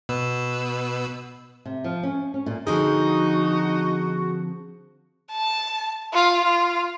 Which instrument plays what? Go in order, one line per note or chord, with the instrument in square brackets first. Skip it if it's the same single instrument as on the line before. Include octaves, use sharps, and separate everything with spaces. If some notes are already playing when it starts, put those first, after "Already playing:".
[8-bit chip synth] B2 B4 E6
[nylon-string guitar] C3
F3
C#4
C#4
A#2
[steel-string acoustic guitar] D3 F3 C4 [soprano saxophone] D#4 [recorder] F#4 [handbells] G#4
[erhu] A5
F4
F4